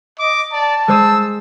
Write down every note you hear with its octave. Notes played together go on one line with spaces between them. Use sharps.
D#5 D6
D5 A5
G#3 C5 D#6 E6